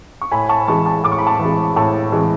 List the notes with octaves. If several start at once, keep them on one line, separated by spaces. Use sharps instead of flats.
C#6
A2 G#5 B5
A5 C#6
E3 G#3 A5 C#6
A5 C#6
A2 D6
C#6
B5
A5 C#6
E3
G#3
A2 A5 C#6
E3 G#3